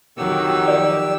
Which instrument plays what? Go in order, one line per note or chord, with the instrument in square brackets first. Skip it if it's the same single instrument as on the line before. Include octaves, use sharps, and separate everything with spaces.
[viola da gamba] F2 D#3 F#3 [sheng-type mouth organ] G4 E6
[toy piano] D5